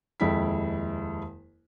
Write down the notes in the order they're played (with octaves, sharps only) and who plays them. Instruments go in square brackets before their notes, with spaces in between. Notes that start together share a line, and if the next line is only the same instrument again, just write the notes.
[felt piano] D#1 F2 G#3 E4 G5 B6